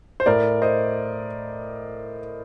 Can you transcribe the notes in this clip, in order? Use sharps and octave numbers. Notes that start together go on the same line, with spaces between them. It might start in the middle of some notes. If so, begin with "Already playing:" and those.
C5
A2 A#4 D5
C5 D#5